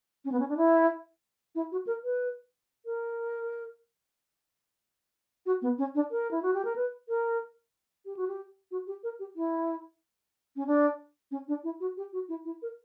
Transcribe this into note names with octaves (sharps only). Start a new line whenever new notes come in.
C#4
B3
C#4
D4
E4
E4
F#4
A#4
B4
A#4
F#4
B3
C#4
D4
A#4
E4
F#4
G4
A#4
B4
A#4
G4
F#4
G4
F#4
G4
A#4
G4
E4
C#4
D4
C#4
D4
E4
F#4
G4
F#4
E4
E4
A#4